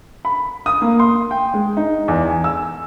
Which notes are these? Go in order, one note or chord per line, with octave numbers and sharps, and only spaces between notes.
B5
D#6
A#3
C6
G5
G#3
D#4
E2
G#5
E6